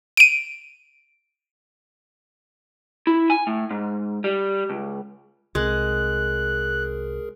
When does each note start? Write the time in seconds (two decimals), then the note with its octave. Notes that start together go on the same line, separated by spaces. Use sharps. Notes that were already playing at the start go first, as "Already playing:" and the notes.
0.17 D7 D#7
3.07 E4
3.30 G#5
3.47 A2
3.71 G#2
4.24 G3
4.70 C#2
5.55 C2 G#3 C4 G#4 A#4 F#6